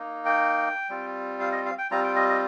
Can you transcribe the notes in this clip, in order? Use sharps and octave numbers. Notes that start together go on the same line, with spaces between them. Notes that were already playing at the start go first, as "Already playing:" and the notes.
Already playing: A#3 D#4
G5
G3 C4 F4
F5
D#5
F5
G5
G3 C4 F4 A#5
G5
D#5
D#5